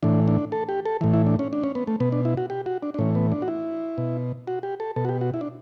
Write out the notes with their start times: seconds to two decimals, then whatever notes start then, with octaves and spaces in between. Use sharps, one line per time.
0.03 A2 E3 D4
0.28 D4
0.52 A4
0.69 G4
0.85 A4
1.01 A2 E3
1.14 E4
1.26 D4
1.39 C#4
1.53 D4
1.64 C#4
1.75 B3
1.87 A3
2.00 B2 B3
2.12 D4
2.25 E4
2.37 F#4
2.50 G4
2.66 F#4
2.83 D4
2.94 D4
2.98 A2 E3 C#4
3.15 B3
3.32 D4
3.42 F#4
3.48 E4
3.98 B2
4.47 F#4
4.63 G4
4.80 A4
4.96 B2 A4
5.05 F#4
5.09 G4
5.21 F#4
5.34 E4
5.41 D4